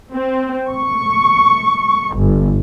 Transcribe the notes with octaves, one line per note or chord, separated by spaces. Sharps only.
C4
C#6
G1